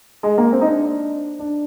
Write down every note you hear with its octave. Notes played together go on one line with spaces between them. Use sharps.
G#3
A#3
C4
D#4
D4
D4